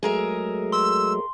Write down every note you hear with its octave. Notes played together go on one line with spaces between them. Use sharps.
F#3 G#3 A3 G#4 A#4 E5
C6 E6